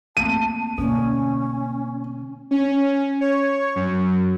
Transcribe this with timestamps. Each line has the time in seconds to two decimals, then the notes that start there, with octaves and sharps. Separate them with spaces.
0.17 A3 A#3 C4 A5 D#7
0.78 B2 D3 A#3 C#4
2.51 C#4
3.21 C#5
3.76 F#2